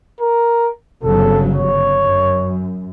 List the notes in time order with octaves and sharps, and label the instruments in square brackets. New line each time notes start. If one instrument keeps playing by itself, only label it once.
[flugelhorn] A#4
[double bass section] G1 C#3 F#3 [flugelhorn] A4
[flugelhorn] C#5
[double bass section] F#2